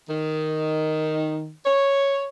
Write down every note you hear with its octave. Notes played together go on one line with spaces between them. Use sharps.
D#3
C#5